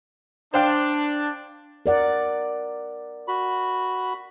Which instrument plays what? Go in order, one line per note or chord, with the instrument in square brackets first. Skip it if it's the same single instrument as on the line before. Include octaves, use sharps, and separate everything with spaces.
[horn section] D4 [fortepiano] C5 F5 G5
[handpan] A#4 D5 F#5
[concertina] F#4 B5